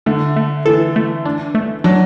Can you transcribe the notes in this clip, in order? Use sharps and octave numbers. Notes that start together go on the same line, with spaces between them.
D3 A3
A3
E3 A4
A3
D4
A3
F#3 D4